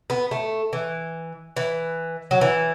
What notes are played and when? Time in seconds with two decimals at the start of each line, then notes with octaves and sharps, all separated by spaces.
0.10 B3
0.31 A3
0.73 E3
1.56 E3
2.31 F#3
2.41 E3